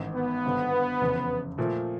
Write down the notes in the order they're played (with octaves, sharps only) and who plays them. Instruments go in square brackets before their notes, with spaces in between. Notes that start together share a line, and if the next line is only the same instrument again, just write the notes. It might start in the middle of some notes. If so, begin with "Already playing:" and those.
Already playing: [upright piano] A1 G#2 D#3
[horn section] B3
[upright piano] G#1 G2 D3
F1 E2 C#3
A#2 F3 A3